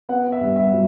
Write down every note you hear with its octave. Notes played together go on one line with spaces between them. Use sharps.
B3 F#5
E5
G2
E5
F#3